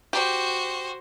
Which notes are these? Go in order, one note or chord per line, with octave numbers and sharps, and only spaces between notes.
F#4 G4 C5